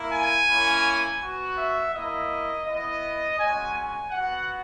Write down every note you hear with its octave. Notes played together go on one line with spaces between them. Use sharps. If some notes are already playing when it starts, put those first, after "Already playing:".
Already playing: A#3 E4
G#5
A#3 C#4 E4
B3 F#4
E5
A#3 E4 D#5
B3 E4 D#5
G#3 C#4 F#4 G#5
G#5
B3 F#4 F#5